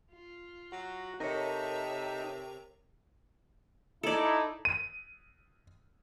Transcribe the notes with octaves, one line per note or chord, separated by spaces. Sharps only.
F4
F#3 F#4
C3 D#4 A4 A#4 C#5 E5
D#4 E4 A4 D5
D#7